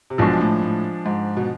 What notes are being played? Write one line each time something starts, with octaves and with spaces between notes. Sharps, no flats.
C3
B1 B2 F3 G#3 D4
A2
A2
G#2
B2